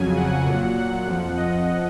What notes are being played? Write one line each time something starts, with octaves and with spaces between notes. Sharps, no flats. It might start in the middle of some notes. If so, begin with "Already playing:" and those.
Already playing: F2 C#3 F#3 G#5
F#5
A#2 F#3
F#5
F2 F3
D#5